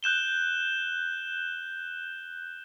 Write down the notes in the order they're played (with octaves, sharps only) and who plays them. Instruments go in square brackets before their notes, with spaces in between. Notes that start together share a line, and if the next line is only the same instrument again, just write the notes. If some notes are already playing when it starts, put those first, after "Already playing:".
[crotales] F#6 G6 E7 G7